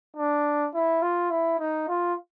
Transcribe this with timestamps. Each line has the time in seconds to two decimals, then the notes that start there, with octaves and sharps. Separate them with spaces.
0.17 D4
0.74 E4
1.02 F4
1.31 E4
1.59 D#4
1.88 F4